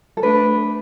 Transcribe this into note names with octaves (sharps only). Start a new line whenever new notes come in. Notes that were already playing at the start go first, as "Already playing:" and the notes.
A4
A3 D4 B4